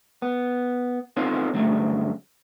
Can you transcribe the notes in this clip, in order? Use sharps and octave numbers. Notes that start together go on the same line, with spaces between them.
B3
B3 C4 D#4 F4 A4 C#5
D2 G2 C#3 F#3 A3